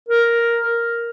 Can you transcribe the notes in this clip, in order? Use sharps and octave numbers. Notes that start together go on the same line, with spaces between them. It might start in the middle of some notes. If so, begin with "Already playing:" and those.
A#4